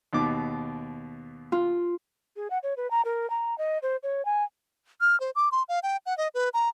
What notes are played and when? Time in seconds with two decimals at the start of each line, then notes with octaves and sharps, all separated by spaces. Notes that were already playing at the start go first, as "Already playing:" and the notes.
0.13 D#2 B2 D6
1.52 F4
2.36 G#4
2.50 F#5
2.63 C#5
2.77 B4
2.91 A#5
3.05 A#4
3.30 A#5
3.58 D#5
3.82 C5
4.03 C#5
4.25 G#5
5.01 F6
5.20 C5
5.36 D6
5.52 C6
5.69 F5
5.83 G5
6.06 F#5
6.18 D#5
6.34 B4
6.54 A#5